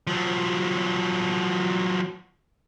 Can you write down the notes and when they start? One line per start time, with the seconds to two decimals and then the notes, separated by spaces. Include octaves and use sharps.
0.07 F3 F#3